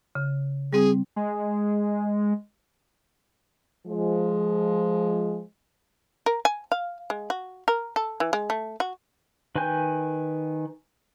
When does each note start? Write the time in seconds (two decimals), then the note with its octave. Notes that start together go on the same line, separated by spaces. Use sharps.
0.15 C#3
0.73 G3 C4 G#4
1.16 G#3
3.87 F3 G#3
6.26 A#4
6.45 G#5
6.72 F5
7.10 G#3
7.30 F#4
7.68 A#4
7.96 A4
8.20 E3
8.33 G#3
8.50 A3
8.80 F#4
9.56 D#3 B4 G5 G#5 G6